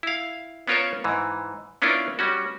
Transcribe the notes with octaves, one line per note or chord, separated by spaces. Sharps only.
E4 F5
B3 C#4 F4 A#4 C5 C#5
G#2 E3
B3 C#4 D4 E4 F4 A#4
G3 C#4 F#4